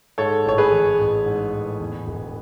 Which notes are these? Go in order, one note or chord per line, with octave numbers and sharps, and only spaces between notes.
G#2 A4 C#5
A1 C#5
G#4 B4
E3
A1
G#2
A1
E2
E1